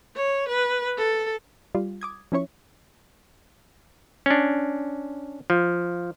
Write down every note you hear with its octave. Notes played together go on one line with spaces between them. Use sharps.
C#5
B4
A4
G3 F4
D6 D#6 G#6
F3 C#4 E4 C#5 C#6
C#4 D4
F3